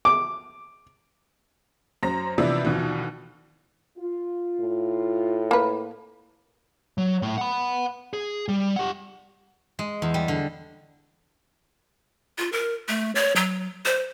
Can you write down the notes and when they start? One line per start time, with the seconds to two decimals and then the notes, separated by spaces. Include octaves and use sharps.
0.05 D6
2.03 F#2 C5 A#5 A#6
2.38 C3 E3 F3 B3 D4 E4
2.64 D#2 B2 D3 E3 F3
3.98 F4
4.60 A2
5.51 A#3 B4
6.98 F#3
7.22 A2 A3
7.38 F#5 B5
8.13 G#4
8.48 G3
8.76 G4 F#5
9.79 G#3
10.02 E2
10.14 G3
10.28 D3
12.38 F4
12.52 A#4
12.88 A3
13.15 C#5
13.36 F#3
13.85 C5